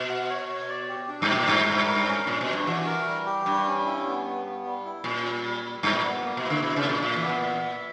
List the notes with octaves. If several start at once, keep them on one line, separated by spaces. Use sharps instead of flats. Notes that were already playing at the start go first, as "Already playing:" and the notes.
Already playing: B2
F#5
C#5
C#5
D5
G4
D4
G2
B2 G4
A#2
G2 G3
G3
A#4
C#4
A#2 D4
B2
D4
G2
E3 F#4
A#4
G3
G4
G2 G3
C#4
E4
B3
B3
B3
G3
E4
A#2 C#4
G3
G3
G3
G2 G3
A#2
B3
A#3
B2
E4
D3
B2 E4
C#3
A#3
A#2
A#2 E5
E3
B3
A#2
E5
E5